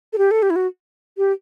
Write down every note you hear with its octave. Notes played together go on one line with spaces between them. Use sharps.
A4
G4
A4
G4
E4
F#4
G4